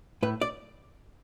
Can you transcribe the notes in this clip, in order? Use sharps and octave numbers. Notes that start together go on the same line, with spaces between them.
A2 B4
D5